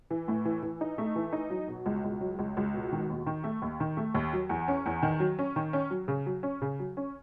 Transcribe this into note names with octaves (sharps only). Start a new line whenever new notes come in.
E3
A2
E3
E3
D#4
A3
E3
D#4
F#3
B2
C#2
C#2
F#3
C#2
C#2
B2
D#3
D#2
D#3
A3
D#2
D#3
A3
D#2
F#3
E2
C#4
E2
D#3
F#3
C#4
D#3
C#4
F#3
C#3
F#3
C#4
C#3
F#3
C#4